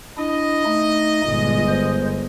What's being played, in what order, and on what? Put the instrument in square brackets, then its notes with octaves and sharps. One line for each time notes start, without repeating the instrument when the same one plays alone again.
[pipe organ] D4 E4 [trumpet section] D#5
[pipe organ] A3 D#4
[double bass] G1 G#3 [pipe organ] A#2
[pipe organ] C5